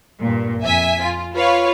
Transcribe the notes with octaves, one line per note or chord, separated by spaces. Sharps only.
G2 A#2
F2 E5 G#5 B6
F4
F4 B4 C#5 F5